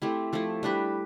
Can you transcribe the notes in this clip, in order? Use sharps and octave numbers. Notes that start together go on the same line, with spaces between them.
A3 C4 E4 G4
F3 A3 E4
G3 D4 G4 B4